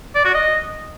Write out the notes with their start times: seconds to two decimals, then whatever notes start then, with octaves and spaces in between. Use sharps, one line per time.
0.15 D5
0.25 F#4
0.35 D#5